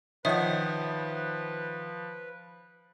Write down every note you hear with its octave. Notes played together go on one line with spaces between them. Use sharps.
D#3 F3 B4 C#5 E5 F#5